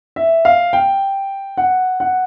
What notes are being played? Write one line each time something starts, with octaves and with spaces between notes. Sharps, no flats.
E5
F5
G5
F#5
F#5